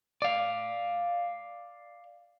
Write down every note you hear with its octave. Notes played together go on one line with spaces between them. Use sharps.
D5 F5